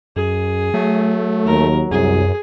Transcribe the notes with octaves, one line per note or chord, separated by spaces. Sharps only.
F#2 G#4
F#3 A3
D#2 A#4
C2 F#2 G#4